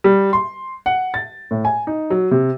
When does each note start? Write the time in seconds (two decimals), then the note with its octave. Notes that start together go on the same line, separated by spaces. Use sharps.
0.04 G3
0.33 C6
0.86 F#5
1.14 A6
1.51 A2
1.65 G#5
1.87 D#4
2.10 F#3
2.31 C3